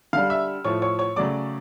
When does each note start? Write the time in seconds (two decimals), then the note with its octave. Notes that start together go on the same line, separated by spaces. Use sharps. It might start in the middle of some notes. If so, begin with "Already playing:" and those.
0.13 D3 G3 F5 F6
0.30 E5 E6
0.65 A2 F3 A3 C#5 C#6
0.82 C#5 C#6
0.99 C#5 C#6
1.16 C#3 F#3 A3 D5 D6